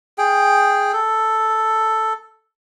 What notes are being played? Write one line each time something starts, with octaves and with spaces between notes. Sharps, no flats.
G#4 G5
A4